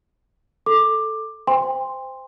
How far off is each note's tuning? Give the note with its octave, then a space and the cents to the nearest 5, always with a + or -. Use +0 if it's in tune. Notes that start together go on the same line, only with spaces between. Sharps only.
A4 +0 D6 +15
C5 -15 G5 +35 C6 +0